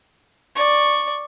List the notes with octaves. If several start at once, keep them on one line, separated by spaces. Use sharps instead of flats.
D5 C#6